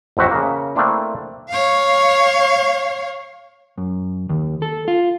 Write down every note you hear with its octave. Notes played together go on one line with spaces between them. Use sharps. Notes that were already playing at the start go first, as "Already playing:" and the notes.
A1 F2 C4 F#4 E5
C#3 A#3
A3 A#3 C4 D4 E4
C#5 F5
F#2
D#2
A4
F4